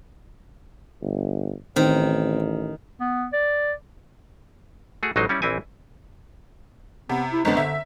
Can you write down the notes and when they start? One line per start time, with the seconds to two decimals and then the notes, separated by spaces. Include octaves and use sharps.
1.01 G1
1.76 A1 D#3 C4
3.00 B3
3.33 D5
5.03 A3 F#4 G#4
5.16 A1 F#3 G#3 D#4 C5
5.29 G3 C#4 E4 D5
5.42 A#1 E3 C4 E4 G#5
7.09 C3 B3
7.32 E4
7.45 F#1 D3 G#3 B3
7.57 D3 E5